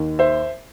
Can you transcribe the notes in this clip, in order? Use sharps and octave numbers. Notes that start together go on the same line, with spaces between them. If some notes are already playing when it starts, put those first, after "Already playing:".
Already playing: D#2 D#3
C5 E5